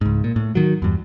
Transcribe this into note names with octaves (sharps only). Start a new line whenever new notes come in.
C#2 G#2
A#2
A2
D#3 F#3
E2 G2